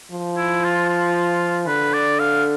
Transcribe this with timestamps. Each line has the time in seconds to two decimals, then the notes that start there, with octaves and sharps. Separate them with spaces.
0.11 F3
0.37 E4
0.64 F4
0.90 F4
1.67 D3 B4
1.93 D5
2.20 F5